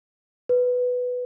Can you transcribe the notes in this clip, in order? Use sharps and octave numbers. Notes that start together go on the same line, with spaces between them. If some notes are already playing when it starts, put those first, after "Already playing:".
B4